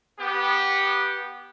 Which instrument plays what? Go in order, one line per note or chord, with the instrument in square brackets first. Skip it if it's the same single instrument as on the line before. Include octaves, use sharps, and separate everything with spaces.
[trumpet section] B3 G4